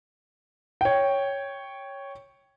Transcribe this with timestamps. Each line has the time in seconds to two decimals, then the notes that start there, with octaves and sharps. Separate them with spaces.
0.81 C#5 G5